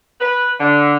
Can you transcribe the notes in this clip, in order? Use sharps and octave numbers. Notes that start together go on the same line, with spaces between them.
B4
D3